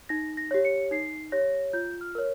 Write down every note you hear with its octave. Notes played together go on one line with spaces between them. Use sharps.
D#4 A#6
A#6
G4 C#5
C#7
D#4 C7
G4 C#5 A#6
F4 G6
F6
A#4 C#5